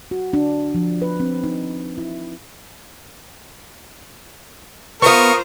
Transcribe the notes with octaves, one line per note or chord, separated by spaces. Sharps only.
F#4
D4
F3
B4
C4
D#4
E4
B3 F4 A#4 C5 F5 C#6 D#6